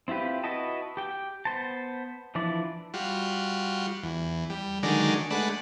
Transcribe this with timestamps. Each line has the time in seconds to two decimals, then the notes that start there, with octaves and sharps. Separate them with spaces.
0.08 C4 E4 F4 G4 B4
0.44 E4 F#4 B4 D#5 A5
0.97 G4 G5
1.45 B3 C5 A5
2.35 E3 F3 D4 E4 D5
2.94 G3 F4 F#4
4.03 E2
4.50 G3
4.83 D3 D#3 F#3 G#3 D4 A#4
5.30 G#3 A3 D4 B4 F#5